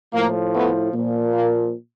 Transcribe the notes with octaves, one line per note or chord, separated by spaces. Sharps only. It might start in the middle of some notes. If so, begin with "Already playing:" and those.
A2 F3 A#3
A3 B3
A#2 F3
A#3